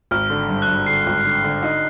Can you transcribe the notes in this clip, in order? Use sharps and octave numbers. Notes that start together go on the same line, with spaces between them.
G#1 F6
D3
G2
F#6
G2
D3 C7
G#1
D3
D3
D#4